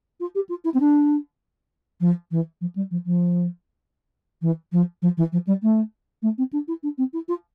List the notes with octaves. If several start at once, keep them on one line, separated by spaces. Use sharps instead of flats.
F4
G4
F4
E4
C4
D4
F3
E3
F3
G3
F3
F3
E3
F3
F3
E3
F3
G3
A3
A3
C4
D4
E4
D4
C4
E4
F4